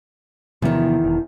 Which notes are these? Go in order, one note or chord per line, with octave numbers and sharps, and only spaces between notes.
E2 C3 D#3 F3 B3
E1